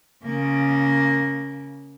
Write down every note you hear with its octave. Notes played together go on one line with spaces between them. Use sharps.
C#3 A#3